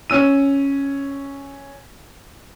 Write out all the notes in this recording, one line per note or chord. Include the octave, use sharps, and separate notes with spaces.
C#4 E6 D#7